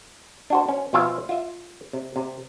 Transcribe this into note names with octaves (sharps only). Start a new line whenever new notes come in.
D4 F#4 C5
C#4
B2 F3 F4 E5 F5 G#5
F4 E5
C3
C3